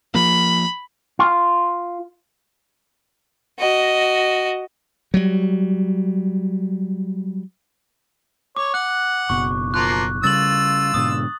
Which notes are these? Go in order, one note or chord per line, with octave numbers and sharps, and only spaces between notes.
F3 A#3 B5
F4
F#4 D#5
F#3 G3
C#5 D6
F#5 F#6
F#1 B2 C#6
F3 A#3 F4 F#6
C#3 G3 F4 E6 A6 F#7
G#2 B2 D3 D#6